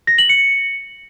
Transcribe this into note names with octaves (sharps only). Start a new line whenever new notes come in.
A#6
F#7
C#7